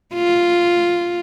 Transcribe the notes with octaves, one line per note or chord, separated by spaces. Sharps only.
F4